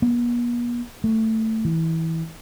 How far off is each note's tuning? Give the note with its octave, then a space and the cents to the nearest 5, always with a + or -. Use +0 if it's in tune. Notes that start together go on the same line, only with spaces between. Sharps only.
B3 -45
A3 +15
E3 -20